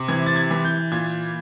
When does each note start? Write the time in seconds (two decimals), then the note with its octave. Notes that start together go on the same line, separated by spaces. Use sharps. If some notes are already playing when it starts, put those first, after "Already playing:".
Already playing: C3
0.08 E3 G#6
0.26 A6
0.36 G#6
0.51 E3
0.65 G6
0.92 A#2 G#6